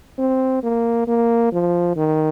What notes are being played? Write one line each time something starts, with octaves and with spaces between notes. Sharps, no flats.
C4
A#3
A#3
F3
D#3